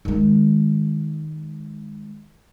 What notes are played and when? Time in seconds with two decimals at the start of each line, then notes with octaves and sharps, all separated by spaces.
0.05 D#3 G#3